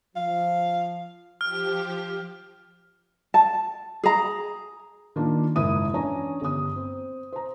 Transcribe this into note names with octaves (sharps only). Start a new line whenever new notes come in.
F3 F5
F3 G4 F6
A5
G#4 A#5
D#3 A#3 D4 F4
F#1 G#2 E4 D#6 D#7
E3 C#4 D4 C#5 A#5
G1 D#6
C4
C5 A#5